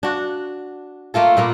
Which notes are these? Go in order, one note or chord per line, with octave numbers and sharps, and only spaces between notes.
D4 F#4
A3 A#3 F4 A4
A#2 A#3 B3